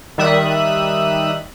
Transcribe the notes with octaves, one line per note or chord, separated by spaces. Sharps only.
D#3 G3 E5 D#6 F#6